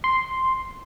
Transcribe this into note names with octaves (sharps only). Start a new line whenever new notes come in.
C6